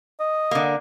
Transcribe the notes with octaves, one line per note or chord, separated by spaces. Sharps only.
D#5
D3 A#3